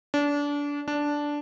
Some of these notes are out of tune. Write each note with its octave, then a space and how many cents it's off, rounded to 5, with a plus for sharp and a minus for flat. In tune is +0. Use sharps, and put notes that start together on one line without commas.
D4 -25
D4 -5